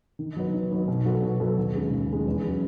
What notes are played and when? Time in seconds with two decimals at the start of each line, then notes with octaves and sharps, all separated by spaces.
0.19 D#3
0.36 F#3 B3 D#4
0.53 D#3
0.71 F#3 B3 D#4
0.88 B2
1.05 F#3 B3 F#4 A4
1.22 B2
1.40 F#3 B3 F#4 A4
1.57 D#2
1.74 C#3 G#3
1.91 D#2
2.09 C#3 G#3
2.26 E2
2.43 C#3 F#3 C#4